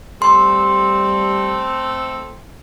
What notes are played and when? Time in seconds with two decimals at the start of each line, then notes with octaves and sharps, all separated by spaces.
0.22 G3 A3 C4 A4 C6